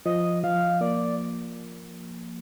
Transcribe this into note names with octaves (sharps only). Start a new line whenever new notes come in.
F3 D#5
F3 F5
A#3 D5